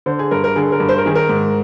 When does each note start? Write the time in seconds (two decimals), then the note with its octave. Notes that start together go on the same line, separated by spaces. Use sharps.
0.06 D3 C5
0.19 G#4
0.31 G2 A#4
0.44 A#4
0.56 D3 G#4
0.72 A#4
0.80 G2
0.89 C5
0.98 A#4
1.06 D#3 G#4
1.15 A#4
1.29 G#2